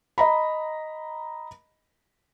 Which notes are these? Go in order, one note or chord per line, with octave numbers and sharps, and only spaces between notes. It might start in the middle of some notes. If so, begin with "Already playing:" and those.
D#5 A#5 B5